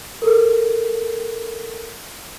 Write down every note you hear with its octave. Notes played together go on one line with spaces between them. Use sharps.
A4 A#4